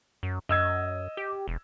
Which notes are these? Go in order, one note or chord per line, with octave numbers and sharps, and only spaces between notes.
F#2
F#2 D#5 E6 G#6
G4
E1